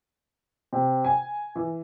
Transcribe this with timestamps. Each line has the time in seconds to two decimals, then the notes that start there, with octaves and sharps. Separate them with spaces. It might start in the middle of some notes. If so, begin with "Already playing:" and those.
0.73 C3
1.05 G#5
1.56 E3